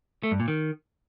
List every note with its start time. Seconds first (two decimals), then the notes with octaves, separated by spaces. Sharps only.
0.23 A3
0.32 G2
0.40 A#2
0.48 D#3